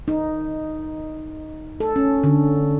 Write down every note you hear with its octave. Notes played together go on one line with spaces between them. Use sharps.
D#4
A4
C#4
D3